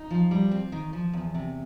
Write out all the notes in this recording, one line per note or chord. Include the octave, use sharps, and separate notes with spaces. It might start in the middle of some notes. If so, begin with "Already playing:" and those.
Already playing: D#4
F3
G3
C4
D#3
F3
E2
C3